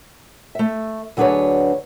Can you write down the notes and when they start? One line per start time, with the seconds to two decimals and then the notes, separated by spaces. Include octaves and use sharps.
0.55 A3 E5
1.17 D2 F#3 D4 G#4 B4 C#5